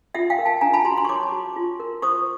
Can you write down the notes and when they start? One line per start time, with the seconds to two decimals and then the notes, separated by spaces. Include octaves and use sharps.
0.15 F4 E5 F#5
0.30 F5 G5
0.39 A#4
0.45 G5 A5
0.61 D4 G#5 A#5
0.74 A5 B5
0.85 F#4 A#5 C6
0.97 A#5 C6
1.05 C#6
1.09 C#5 C6 D6
1.32 F#4
1.56 F4
1.80 A#4
2.02 C5 C#6 D#6